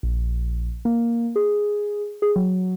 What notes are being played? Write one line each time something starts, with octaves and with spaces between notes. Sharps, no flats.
A#1
A#3
G#4
G#4
F#3